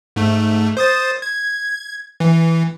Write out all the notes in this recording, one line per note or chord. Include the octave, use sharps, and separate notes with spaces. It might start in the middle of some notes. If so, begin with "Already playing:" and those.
G#2 A3
C5 D#6 A6
G#6
E3